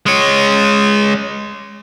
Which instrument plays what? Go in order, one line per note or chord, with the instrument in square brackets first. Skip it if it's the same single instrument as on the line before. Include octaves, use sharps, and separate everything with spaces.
[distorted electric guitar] G#3 C#5